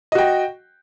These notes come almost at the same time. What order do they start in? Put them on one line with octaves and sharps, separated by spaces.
D#5 F#4 G5